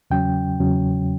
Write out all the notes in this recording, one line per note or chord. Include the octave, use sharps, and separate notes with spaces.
E2 C#3 F#3 C#4 G5
E2 C#3 F#3 C#4